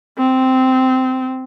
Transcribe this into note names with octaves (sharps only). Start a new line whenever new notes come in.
C4